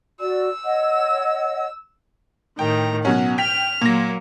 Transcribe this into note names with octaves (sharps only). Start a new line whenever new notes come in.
F#4 D5 E6
C#5 D#5 F#5
A2 D#3 G5 A#5
B2 F#3 C#4 F#5
G5 F6 B6 F7
A#2 F#3 A#3 A#6